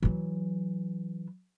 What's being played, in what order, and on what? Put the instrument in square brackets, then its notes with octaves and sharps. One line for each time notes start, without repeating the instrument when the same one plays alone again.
[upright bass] E3 F#3